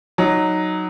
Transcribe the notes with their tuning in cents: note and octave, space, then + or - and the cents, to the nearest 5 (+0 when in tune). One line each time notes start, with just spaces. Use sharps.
F#3 +0 D#4 +0